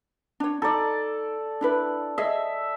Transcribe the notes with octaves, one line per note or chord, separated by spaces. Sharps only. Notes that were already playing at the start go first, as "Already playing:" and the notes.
D4 C#5
D#4 A4 D5
D4 E4 B4
G#4 D#5 E5